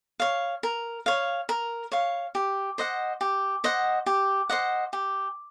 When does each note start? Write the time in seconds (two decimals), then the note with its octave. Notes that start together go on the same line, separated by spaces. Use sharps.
0.20 C#5 F5
0.63 A#4
1.06 C#5 F5
1.49 A#4
1.92 C#5 F5
2.35 G4
2.78 C5 D#5 F#5
3.21 G4
3.64 C5 D#5 F#5
4.06 G4
4.49 C5 D#5 F#5
4.93 G4